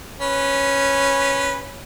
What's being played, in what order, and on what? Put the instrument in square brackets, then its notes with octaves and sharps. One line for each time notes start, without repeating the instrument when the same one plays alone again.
[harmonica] C#4 B4